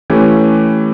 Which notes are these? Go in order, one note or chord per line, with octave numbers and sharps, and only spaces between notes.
E3 A3 C#4 G4